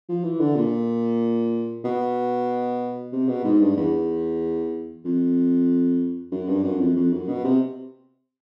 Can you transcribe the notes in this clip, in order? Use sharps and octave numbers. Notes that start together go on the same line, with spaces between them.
F3
E3
D3
A#2
B2
C3
B2
G#2
G2
E2
F2
F#2
G2
F#2
F2
F2
F#2
B2
C3